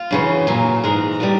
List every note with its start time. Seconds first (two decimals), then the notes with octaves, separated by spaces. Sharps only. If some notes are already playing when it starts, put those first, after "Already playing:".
Already playing: F4
0.11 F#2 C#3 E3
0.47 A#2 F#3
0.84 G#2 E3 G#3 A#4
1.20 A2 E3 G3